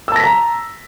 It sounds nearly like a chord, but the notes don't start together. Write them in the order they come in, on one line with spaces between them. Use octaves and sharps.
E6 A5 A#6 B6 A#5